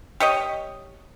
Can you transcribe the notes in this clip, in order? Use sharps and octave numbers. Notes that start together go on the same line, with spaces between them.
G4 C#5 D#5